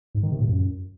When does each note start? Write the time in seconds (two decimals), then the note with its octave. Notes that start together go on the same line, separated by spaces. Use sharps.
0.15 G#2
0.23 D#3
0.32 C3
0.40 A2
0.49 F#2